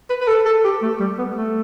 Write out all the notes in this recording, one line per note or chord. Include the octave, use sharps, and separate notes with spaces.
B4
B4
A4
A4
G4
A3
G3
B3
A3